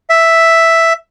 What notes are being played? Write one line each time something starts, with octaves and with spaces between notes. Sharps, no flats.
E5